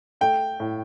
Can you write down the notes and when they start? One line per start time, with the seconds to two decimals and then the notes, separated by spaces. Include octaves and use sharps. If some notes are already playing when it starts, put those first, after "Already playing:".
0.21 A3 G5
0.60 A2